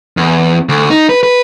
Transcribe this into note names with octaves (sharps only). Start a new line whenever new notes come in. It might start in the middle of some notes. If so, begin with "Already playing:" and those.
E2
D2
D#4
B4
B4